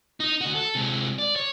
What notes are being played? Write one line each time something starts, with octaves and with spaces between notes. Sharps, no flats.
D#4
D2 F#4
A4
C3 G#3
D5
C#5